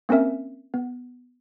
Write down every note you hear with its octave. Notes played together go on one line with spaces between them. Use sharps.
A#3 C4 C#4 A#4 E5
B3